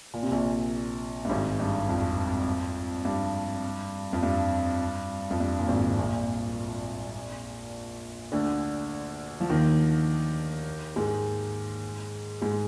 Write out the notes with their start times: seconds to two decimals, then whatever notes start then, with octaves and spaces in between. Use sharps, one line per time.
0.14 A#2
0.23 C3
0.31 A#1 A#2
1.25 G2
1.29 G#1 G#2
1.60 G2
1.89 F2
3.05 G2
4.13 F2
4.23 G2
5.31 F2
5.40 G2
5.59 A#2
5.68 G#1 G#2
5.98 A#1 A#2
8.32 D2 D3
9.40 F3
9.49 D#2 D#3
10.96 G#2 G#3
12.41 G#2 G#3